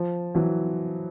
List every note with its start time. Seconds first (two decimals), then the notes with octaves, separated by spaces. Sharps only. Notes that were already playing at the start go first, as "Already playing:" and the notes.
Already playing: F3
0.35 E3 F#3